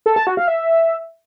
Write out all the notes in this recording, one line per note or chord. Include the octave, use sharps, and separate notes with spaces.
A4
A5
F#4
F5
E5